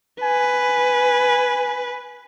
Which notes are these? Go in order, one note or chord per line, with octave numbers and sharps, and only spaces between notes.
B4 G#5